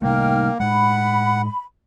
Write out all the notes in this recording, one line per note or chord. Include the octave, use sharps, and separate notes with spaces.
C3 G3 A3 A#3 D#4 G5 F6
A2 G#3 F#5 B5